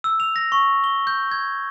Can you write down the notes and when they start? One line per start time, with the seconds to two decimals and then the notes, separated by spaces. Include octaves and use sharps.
0.04 E6
0.20 F7
0.36 A#6
0.52 C#6
0.84 G7
1.07 G6
1.31 G#6